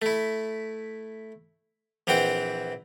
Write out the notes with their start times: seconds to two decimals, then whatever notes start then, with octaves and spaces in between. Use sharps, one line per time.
0.02 A3 E4
2.07 A#1 E3 C4 F#5 G5